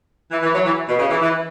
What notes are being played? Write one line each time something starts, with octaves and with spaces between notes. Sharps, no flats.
E3
E3
F#3
E3
B2
C#3
E3
E3